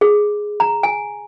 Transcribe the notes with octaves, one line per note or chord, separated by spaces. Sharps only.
G#4
A#5
G#5